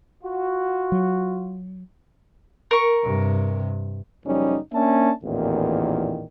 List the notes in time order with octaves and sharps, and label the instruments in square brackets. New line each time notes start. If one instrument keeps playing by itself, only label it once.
[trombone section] F4 F#4
[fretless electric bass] F#3
[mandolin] A#4 C#6
[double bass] G2 C3
[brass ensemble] F#1 F3 G3 C#4 D#4
A#3 C#4 D4 E5 A5
A1 E2 A#2 D#3 E3